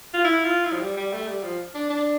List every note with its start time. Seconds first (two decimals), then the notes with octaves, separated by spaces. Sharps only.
0.14 F4
0.24 E4
0.44 F4
0.65 E4
0.73 F3
0.81 G3
0.97 G3
1.13 A3
1.28 G3
1.43 F3
1.75 D4
1.90 D4